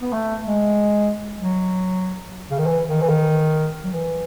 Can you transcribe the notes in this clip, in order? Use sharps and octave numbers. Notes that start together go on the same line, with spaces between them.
B3
A3
G#3
F#3
C#3
D#3
E3
D#3
E3
D#3
F#3
E3